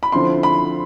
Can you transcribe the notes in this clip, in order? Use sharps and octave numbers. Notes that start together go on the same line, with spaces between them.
B5
D3 F3 C4 E4 C6
B5